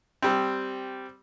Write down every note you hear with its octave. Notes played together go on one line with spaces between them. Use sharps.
G3 C4